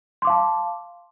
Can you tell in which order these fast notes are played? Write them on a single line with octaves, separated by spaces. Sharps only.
C6 D6 F5 A5